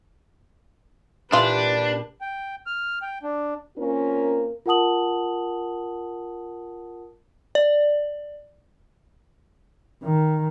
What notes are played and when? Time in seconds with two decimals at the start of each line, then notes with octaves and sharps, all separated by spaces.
1.32 A#2 E3 D4 F4 G4 B4
2.21 G5
2.67 F6
3.02 G5
3.23 D4
3.78 A#3 C4 C#4 F4 A#4
4.66 F4 A#4 F#5 A5 D#6 F#7
7.55 D5
10.04 D#3